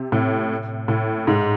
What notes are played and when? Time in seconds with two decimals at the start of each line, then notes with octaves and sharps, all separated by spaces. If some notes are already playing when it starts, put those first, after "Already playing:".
Already playing: C3
0.12 A2
0.88 A2
1.27 G#2